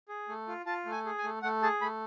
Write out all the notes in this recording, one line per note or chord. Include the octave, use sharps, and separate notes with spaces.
G#4
A3
F4
F4 A5
A3
G#5
G#4
G#5
A3
A3 F#5
G#4 A5
A3 B5